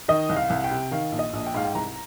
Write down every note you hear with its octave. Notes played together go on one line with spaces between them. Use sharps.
D#3 D#5
C2
F5
C2
G5
C3
D#3 F5
A#1
D#5
A#1
G5
G#2 F5
G5
C2 A#5